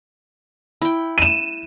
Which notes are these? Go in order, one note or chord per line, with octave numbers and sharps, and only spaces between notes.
E4 G5
D#7 E7